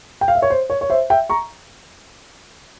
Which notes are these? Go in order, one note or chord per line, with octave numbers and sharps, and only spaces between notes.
G5
F5
E5
C#5
C5
C#5
C#5
C5 E5
E5 G5
A#5 C#6